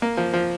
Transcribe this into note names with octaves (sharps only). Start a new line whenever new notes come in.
A#3
F3
F3